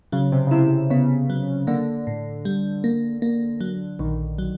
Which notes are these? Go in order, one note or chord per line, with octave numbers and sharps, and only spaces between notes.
C#3 F#3
C3
C#3
C3 E4
C3
C#3 B3
F#3
D3 A#3
A2
G3
A#3
A#3
F#3
A#1 D#3
F#3